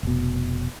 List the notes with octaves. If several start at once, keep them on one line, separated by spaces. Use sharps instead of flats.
F1 B2